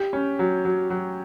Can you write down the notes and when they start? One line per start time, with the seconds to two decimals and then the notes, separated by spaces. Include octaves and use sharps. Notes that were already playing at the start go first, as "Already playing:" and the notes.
Already playing: G4
0.13 C#4
0.39 F#3
0.65 F#3
0.90 F#3